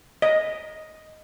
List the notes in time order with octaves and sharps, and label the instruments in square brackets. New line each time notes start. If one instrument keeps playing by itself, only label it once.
[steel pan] D#5